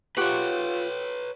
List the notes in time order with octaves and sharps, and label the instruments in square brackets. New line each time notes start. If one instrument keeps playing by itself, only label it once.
[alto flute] F4 [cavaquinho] G4 F#5 C#6 [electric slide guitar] B4 C#5